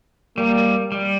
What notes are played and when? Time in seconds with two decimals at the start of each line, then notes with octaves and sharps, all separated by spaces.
0.37 G3 A#3
0.92 G3